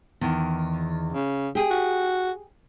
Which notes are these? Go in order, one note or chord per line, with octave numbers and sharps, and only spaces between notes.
E2 D#3
C#3
G4 G#4
F#4